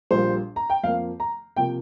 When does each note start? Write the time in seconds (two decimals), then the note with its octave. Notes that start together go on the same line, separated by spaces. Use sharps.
0.11 A#1 A#2 G3 A#3 C5
0.56 A#5
0.70 G5
0.84 F2 F3 A#3 F5
1.20 A#5
1.56 C3 F3 A#3 G5